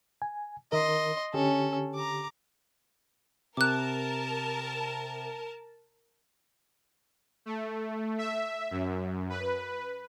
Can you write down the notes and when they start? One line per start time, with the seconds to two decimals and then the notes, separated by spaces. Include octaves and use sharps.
0.22 G#5
0.72 D#3 A#4 D#5 C6
1.34 D3 C#4 G4 A4
1.95 A#5 D6
3.57 C3 A#4 A5 D6 F#6
7.46 A3
8.18 E5
8.71 F#2
9.30 B4